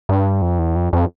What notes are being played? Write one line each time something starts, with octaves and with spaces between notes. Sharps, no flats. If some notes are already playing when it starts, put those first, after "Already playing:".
G2
F2
E2
F2
F2